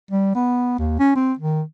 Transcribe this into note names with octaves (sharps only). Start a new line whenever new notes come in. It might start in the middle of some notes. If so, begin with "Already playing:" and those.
G3
B3
D#2
C#4
C4
D#3